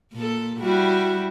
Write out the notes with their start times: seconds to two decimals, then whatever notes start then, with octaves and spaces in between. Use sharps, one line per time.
0.13 A#2 A4
0.60 G3 E4 F#4